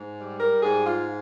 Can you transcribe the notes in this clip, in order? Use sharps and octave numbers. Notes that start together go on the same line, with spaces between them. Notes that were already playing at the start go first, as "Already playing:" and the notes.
Already playing: G#2
G3
A#4
G#2 G#4
F4